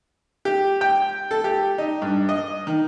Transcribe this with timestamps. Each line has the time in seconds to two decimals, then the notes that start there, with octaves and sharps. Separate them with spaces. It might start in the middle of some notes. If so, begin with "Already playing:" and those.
0.45 G4
0.81 G5
1.31 A4
1.44 G4
1.78 D#4
2.02 G2
2.29 D#5
2.67 D#3